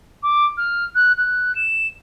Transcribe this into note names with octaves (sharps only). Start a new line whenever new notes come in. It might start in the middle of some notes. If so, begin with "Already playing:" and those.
D6
F6
F#6
F#6
E7